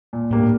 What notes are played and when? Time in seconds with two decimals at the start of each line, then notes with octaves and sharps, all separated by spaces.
0.13 A#2
0.31 A2 G3 A#3 D4
0.43 A2